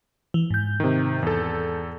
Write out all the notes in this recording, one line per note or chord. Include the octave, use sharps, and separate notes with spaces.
E3
G#2 G6
C3 D#3
E2 A4